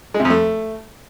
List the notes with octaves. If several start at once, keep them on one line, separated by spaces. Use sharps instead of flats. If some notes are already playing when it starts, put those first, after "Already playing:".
G#3
C3
F2
A3